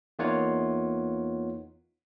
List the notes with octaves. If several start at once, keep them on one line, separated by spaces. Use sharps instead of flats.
E2 A#3 D#4 F4 C#5 F#5